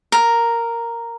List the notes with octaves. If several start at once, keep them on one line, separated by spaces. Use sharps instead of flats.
A#4